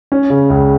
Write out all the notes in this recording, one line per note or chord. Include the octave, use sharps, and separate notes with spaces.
C#4
C#3
C#2